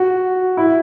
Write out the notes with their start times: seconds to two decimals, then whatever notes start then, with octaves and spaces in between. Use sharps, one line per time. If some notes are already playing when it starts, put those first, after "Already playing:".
Already playing: F#4
0.57 E4